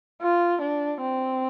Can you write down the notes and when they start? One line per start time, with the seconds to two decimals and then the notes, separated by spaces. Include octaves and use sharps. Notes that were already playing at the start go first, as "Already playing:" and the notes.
0.22 F4
0.62 D4
1.02 C4